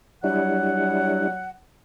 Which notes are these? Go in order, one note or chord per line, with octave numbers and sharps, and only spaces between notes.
F#3 G3 D4 E4 F#5